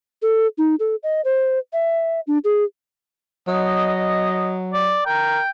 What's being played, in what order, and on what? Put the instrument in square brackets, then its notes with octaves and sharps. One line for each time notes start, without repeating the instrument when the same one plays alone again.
[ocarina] A4
D#4
A4
D#5
C5
E5
D4
G#4
[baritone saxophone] F#3 [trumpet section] D#5
[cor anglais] D5
[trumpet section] A#4 A#5 [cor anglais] G5